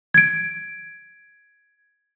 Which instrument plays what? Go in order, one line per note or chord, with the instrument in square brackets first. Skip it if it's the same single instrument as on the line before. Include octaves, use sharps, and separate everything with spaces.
[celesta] G#6 D7